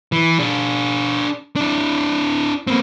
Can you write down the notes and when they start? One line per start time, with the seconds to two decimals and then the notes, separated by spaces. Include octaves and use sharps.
0.12 E3
0.39 D4 G#4
1.56 D4 E4
2.67 A#3 C4